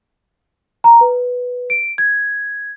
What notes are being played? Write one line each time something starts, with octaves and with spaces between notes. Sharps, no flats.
A#5
B4
D7
G#6